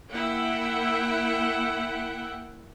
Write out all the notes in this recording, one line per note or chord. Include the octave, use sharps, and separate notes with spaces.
A#3 E4 E5 F#5 G5